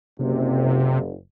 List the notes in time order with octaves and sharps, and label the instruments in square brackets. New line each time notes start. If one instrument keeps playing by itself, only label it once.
[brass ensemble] F#1 [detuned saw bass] C3